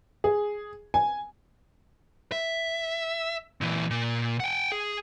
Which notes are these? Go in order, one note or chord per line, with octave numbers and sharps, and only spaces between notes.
G#4
G#5
E5
A#2 E3
A#2
F#5 G5
G#4